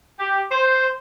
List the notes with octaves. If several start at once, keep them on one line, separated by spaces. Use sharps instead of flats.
G4
C5